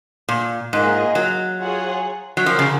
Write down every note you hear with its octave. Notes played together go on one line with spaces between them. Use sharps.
A#2
G#2 A#3 F4 G#4 D#5
F#3
F4 G#4 C#5 F#5
F#3
F3 C#4 F#4 A#4
C#3